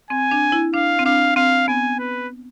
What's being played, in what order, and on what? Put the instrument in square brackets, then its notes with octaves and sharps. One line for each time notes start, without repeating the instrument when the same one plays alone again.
[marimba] C4 [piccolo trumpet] G#5
[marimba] D4
E4
[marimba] D4 [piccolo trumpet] F5
[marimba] C4
[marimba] D4 [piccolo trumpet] F5
[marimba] C4 [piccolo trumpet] F5
[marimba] B3 [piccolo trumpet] G#5
[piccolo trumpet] B4